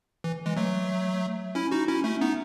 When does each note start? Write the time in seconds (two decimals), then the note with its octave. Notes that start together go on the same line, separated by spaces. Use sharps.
0.24 E3
0.46 E3 G#3
0.56 F#3 A3
1.55 C#4 E4
1.72 D#4 F#4
1.88 C#4 E4
2.04 A3 C#4
2.21 B3 D#4